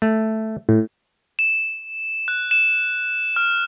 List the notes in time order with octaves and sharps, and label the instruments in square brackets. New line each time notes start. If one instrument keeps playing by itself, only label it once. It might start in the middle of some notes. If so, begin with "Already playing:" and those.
[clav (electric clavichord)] A3
[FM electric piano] A2
[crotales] E7
F#6
E7
F6